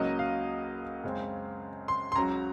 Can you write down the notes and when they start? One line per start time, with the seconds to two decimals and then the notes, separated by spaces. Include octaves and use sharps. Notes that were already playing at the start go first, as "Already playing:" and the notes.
Already playing: C#2 C#3 F#3 A#3 D#5
0.19 F5
1.04 F#2 C#3 G#3 C4
1.88 C6
2.12 C6
2.16 C#2 C#3 F#3 A#5